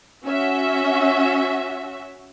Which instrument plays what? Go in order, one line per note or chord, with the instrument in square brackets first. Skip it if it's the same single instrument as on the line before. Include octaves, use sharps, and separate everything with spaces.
[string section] C#4 F#4 E5